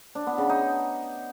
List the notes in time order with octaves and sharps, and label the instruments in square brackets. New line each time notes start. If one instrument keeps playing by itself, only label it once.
[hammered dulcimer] D4
B3
C#3
D#4